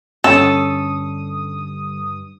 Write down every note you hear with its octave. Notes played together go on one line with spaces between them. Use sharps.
G2 D3 G3 C#4 A4 D#6